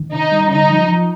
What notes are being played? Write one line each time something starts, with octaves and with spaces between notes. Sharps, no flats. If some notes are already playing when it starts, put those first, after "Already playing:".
Already playing: D#3
C3 D#4
G3
D3 D#4
F3
F3